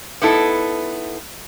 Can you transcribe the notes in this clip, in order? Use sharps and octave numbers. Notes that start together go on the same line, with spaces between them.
B3 D#4 E4 A4